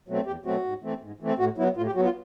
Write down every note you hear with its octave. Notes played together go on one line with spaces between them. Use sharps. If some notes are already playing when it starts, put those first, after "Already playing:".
B2 F#3 A3 C4
E2 G4
B2 F#3 A3 C4 F#4
G#2
E3 A3 C4
G#2
E3 A3 C4
A2 F#4
F#3 B3 E4
A2 F4
G4
F#3 B3 F#4
F4